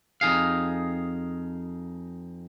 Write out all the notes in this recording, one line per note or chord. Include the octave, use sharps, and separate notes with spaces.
F2 D#4 G#4 F5